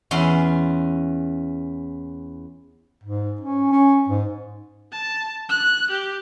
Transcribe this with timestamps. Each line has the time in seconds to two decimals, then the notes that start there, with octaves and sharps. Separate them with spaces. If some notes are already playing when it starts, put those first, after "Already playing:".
0.11 E2 C#4 C6
3.04 G#2
3.41 C#4
3.71 C#4
4.08 G#2
4.92 A5
5.49 F#6
5.91 G4